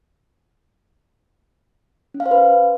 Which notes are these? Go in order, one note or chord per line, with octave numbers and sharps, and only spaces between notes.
C#4
F5
C5
B4